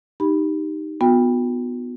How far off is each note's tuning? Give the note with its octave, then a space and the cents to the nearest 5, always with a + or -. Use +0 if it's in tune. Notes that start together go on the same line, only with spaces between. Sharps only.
D#4 -5 G4 +0 B5 +0
B3 +0 F#4 -45 G5 +25